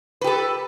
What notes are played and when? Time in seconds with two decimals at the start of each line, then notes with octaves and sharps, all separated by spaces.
0.21 B4
0.24 G4
0.27 A4